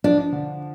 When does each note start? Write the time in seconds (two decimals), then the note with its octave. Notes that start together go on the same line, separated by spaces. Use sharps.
0.04 F3 D4
0.33 D3